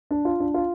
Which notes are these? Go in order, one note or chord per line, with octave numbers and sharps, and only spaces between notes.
D4
F4
D4
F4